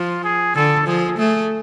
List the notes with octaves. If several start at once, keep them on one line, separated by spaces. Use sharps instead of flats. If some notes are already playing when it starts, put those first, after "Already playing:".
Already playing: F3 F4
G#4
D3 A4
F3 G#4
A3 G#4